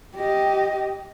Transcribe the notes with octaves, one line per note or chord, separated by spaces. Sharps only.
G4 D#5